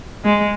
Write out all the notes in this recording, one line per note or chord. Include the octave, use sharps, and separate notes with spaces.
G#3